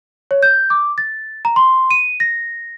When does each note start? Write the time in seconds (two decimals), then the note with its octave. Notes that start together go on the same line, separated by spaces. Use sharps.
0.31 C#5
0.43 G6
0.70 D6
0.98 A6
1.45 A#5
1.56 C6
1.91 D#7
2.20 A#6